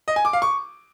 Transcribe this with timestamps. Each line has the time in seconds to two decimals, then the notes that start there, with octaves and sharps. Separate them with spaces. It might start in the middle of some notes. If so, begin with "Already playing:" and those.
0.08 D#5
0.16 G#5
0.25 D6
0.33 F5
0.42 C#6